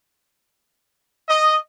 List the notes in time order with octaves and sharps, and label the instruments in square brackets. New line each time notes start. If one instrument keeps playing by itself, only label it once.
[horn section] D#5